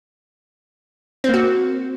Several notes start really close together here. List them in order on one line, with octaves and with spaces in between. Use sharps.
C4 A#3 F#4